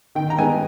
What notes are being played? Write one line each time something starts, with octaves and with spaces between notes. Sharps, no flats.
D#3 G5
A#5
G#3 B3 D#4 G#5